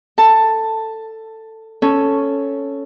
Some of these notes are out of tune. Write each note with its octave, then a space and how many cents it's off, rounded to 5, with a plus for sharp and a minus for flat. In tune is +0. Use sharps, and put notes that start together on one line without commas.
A4 +15 A5 +10
C#4 +0 A4 +0